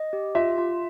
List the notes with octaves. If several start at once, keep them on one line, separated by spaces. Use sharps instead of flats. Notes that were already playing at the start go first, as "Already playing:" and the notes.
Already playing: D#5
G4
F4 E5
F4